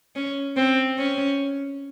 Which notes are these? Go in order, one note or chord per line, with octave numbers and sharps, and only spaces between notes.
C#4
C4
C#4